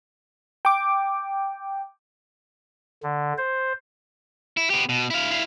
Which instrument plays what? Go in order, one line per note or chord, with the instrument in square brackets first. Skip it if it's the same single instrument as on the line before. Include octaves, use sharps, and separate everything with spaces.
[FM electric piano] G5 D6
[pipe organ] D3
C5
[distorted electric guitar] E4
B3 G4
B2
E4 F5
E4 F5